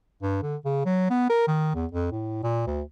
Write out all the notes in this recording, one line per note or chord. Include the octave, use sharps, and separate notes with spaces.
G2
D3
C#3
F#3
B3
A#4
D#3
E2
F2
A2
A#2
D2